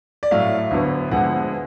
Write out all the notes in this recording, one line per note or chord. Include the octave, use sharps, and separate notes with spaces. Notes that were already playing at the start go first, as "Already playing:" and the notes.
D5
A2 F#3 A3 F5
D2 D3 F#3 B3
D2 D3 F3 G#3 B3 F#5